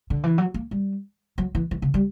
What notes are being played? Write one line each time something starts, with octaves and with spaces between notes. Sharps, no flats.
D3
E3
F#3
A#3
G3
F#3
E3
E3
C#3
G3